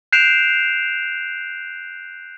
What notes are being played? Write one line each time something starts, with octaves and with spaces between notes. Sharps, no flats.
F#6 G6 C7 D7 E7 F7